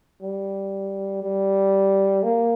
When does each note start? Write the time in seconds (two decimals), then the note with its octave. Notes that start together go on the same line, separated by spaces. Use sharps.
0.22 G3
1.22 G3
2.23 A#3